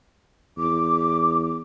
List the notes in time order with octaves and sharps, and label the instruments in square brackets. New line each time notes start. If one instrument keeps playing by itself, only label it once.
[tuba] E2 [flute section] D6